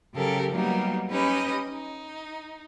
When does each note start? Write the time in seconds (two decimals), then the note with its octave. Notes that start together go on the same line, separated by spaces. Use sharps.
0.14 C#3 F#3 G4 A4 A#4
0.51 F#3 G3 A#3 B3 D#4 G4
1.09 C#4 D#4 G4 B4 D#5
1.69 D#4